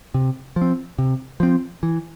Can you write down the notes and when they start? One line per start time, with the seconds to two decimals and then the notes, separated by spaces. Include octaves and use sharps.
0.14 C3
0.56 F3
0.62 C4
0.98 C3
1.40 F3 C4
1.83 E3